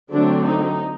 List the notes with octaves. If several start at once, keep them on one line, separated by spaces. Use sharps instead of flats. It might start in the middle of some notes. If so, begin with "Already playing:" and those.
D3 F#3 A3 C4 D4
D#4